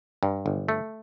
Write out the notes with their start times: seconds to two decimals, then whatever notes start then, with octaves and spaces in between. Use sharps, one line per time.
0.23 G2
0.46 G1
0.69 A3